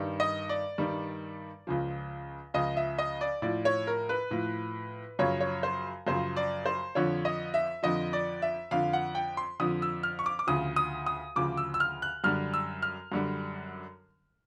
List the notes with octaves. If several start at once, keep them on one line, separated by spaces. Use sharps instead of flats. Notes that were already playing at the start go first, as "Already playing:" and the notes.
Already playing: G2 D#3 G3
D#5
D5
G2 D#3 G3
C#2 C#3 F3
C#2 C#3 F3 D#5
E5
D#5
D5
A2 F3 D5
C#5
A#4
B4
A2 F3
F#2 C#3 F3 C#5
C#5
C5
F#2 C#3 F3 C5
D5
C5
F2 D3 F3 C#5
D#5
E5
F2 D3 F3 D#5
D5
E5
F2 D3 F3 F5
F#5
G5
C6
F2 D3 F3 D#6
E6
F6
C#6
D6
D6
D2 C#3 F3 D#6
D#6
D#6
D2 C#3 F3 D6
E6
E6
F6
F#6
F#2 D3 G3 F6
E6
F6
F#2 D3 G3